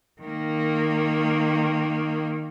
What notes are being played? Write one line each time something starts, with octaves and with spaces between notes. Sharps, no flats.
D#3 A#3